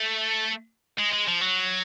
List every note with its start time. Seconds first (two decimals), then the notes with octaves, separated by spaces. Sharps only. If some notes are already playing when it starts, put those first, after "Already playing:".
Already playing: A3
0.99 G#3
1.13 G#3
1.28 F3
1.41 F#3